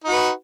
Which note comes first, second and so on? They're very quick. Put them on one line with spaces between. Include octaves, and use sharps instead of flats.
D#4 F#4 B4